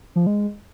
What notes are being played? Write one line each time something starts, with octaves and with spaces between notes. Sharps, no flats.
F3
G#3